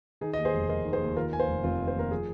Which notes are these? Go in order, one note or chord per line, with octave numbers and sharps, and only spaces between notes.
D#3 D#4 G#4
D#2 D#5
G#4 C5
F1
F1 A#4 D#5
D#3
G#4 C5
D#2
D#3 F4 A#4
D#2 G#5
C5 F5
F1
F1 C4 F4
D#3
C5
D#2 A#4
F3 G#4